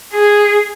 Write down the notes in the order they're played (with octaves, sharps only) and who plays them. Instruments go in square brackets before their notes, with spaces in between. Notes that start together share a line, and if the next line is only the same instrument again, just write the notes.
[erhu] G#4